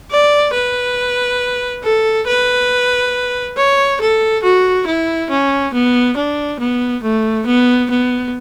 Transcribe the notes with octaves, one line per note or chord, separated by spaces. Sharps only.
D5
B4
A4
B4
C#5
A4
F#4
E4
C#4
B3
D4
B3
A3
B3
B3